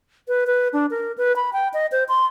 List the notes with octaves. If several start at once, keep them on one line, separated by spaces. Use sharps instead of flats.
B4
B4
D4
A#4
B4
B5
G5
D#5
C5
C6